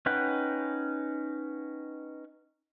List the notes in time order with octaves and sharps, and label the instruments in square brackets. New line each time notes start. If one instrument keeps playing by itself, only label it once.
[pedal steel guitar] C#4 D#4 B4 F#5 G5